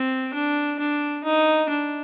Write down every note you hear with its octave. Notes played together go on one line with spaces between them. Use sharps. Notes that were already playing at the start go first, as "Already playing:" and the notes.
Already playing: C4
D4
D4
D#4
D4